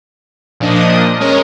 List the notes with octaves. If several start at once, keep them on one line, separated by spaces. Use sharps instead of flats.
A#2 F3 D4 D#5 D#6
G#3 C#4 A#4 C#5 D#5